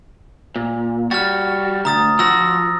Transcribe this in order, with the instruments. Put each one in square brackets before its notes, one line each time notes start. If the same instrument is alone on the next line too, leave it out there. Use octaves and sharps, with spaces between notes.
[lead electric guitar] A#2
[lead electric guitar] G3 F#4 [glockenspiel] F6 A6
[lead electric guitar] D2 [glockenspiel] A#5 D#6 A6
[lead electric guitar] F3 F#4 [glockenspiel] E6 A#6